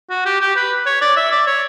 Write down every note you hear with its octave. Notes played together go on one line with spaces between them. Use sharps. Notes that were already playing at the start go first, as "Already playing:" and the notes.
F#4
G4
G4
B4
C#5
D5
E5
D5
C#5